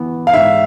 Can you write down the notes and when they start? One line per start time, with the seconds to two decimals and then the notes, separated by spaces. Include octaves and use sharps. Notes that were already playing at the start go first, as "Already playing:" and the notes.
Already playing: E3 B3
0.27 F5
0.33 G#2 E5